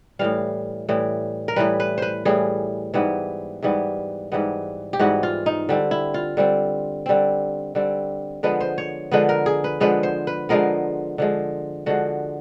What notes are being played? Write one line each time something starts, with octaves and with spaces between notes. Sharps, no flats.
A2 E3 G3 F5
A2 E3 G3
A#4
A2 E3 G3 B4
B4
B4 C5
A2 E3 G3 G#4
G#2 E3 G3 B3
G#2 E3 G3 B3
G#2 E3 G3 B3
G4
G#2 E3 G3 B3 F#4
F4
D#4
D3 G3 C4
E4
F4
D3 G3 C4
D3 G3 C4
D3 G3 C4
D3 F3 G#3 B3 B4
C5
C#5
D3 F3 G#3 B3 B4
A#4
G#4
B4
D3 F3 G#3 B3 B4
C5
B4
D3 F3 G#3 B3 A#4
D3 F3 G#3
D3 F3 G#3 F#4